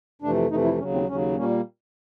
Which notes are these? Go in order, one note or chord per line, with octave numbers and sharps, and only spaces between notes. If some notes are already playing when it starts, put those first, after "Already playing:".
F2 C3 E3 A3 D4
F2 C3 E3 A3 D#4
E4
D#2 C#3 F#3 C#4
C4
D#2 C#3 F#3 C#4
A#2 G3 A#3 C#4